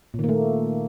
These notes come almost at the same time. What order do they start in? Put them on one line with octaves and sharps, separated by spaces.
A#2 D#3 A#3 A3